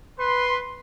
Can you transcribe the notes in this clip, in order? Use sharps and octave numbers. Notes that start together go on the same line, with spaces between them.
B4 C6